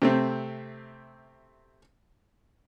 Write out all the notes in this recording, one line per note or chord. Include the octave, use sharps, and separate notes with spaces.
C3 A3 C4